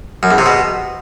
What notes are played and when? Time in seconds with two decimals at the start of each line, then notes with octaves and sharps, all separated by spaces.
0.23 F#2
0.31 E2
0.38 C3
0.46 B2